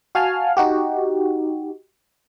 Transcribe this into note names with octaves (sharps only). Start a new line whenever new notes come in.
F#4 F5 G#5 A5 F6
D#4 F#4 G4